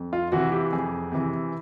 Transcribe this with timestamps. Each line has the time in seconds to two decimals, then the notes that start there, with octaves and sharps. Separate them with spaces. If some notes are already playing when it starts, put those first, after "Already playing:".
Already playing: F2
0.13 F4
0.32 C3 E3 F#4
0.52 G4
0.72 F2 G#4
1.12 C3 E3